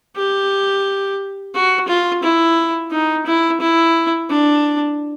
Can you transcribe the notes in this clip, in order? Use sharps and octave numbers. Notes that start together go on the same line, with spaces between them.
G4
F#4
F4
E4
D#4
E4
E4
D4